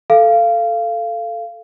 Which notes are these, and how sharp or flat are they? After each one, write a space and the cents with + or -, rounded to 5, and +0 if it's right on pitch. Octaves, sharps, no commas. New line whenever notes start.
A4 +0 F5 -20